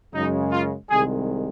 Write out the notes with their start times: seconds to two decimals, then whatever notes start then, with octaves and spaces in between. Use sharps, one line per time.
0.13 F#2 C#3 G#3 D#4
0.52 F4
0.90 C2 C3 D#3 G#3 G#4